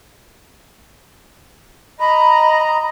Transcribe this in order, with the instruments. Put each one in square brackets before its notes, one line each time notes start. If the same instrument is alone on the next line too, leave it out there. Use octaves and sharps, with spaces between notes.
[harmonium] D#5 A#5 [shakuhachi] B5